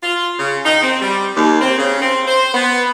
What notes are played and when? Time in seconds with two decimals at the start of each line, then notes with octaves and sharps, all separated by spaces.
0.03 F4
0.39 C#3
0.65 D#4
0.82 C4
1.01 G3
1.36 D#2
1.61 C4
1.78 C#3
2.01 C4
2.27 C5
2.54 B3